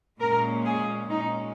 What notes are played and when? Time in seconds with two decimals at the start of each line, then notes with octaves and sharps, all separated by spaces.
0.20 A#2 G#3 C#4 A#4
0.65 G#4
1.10 A#2 G#3 C#4 D#4